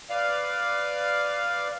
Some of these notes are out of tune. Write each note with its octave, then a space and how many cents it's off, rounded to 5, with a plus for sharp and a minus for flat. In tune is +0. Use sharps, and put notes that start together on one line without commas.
B4 +15 D5 +0 F5 +0